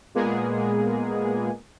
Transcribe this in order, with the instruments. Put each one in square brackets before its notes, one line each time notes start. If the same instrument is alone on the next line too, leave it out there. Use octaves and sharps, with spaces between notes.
[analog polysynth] A#2 G#3 A#3 B3 G#4